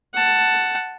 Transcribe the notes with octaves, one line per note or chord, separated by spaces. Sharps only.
F#5 A5